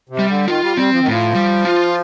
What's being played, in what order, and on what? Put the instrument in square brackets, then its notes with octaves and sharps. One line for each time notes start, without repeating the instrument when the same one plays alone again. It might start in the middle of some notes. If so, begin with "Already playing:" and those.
[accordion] C3
[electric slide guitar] G3
[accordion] D3
[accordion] D#3 [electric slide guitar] F4
[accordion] G3
[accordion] G3 [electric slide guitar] C4
[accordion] F3
D#3
[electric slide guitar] A2 [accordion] F3
[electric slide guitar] G3
F4